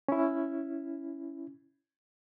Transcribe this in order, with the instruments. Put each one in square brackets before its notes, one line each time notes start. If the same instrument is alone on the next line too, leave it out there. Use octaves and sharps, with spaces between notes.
[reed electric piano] C#4 E4